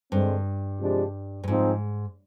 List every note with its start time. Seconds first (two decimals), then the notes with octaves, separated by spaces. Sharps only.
0.12 G2 D3 G#3 C4
0.80 C3 F3 G#3 D4 G4
1.43 G2
1.48 G#2 F3 C4 D#4 G#4